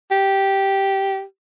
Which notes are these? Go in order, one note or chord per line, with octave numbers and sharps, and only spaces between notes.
G4